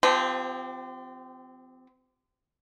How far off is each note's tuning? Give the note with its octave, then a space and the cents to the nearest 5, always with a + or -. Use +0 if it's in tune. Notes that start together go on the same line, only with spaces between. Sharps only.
F3 +0 C4 -30 G4 +20